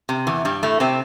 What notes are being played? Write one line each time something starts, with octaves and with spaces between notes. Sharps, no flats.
C3
E2 E3
G2 G3
A2 A3
C3 C4